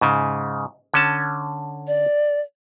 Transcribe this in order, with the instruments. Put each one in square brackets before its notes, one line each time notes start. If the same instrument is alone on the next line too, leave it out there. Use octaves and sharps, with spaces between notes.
[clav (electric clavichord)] G#2 C#3
D3 C#4 A5
[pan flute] D5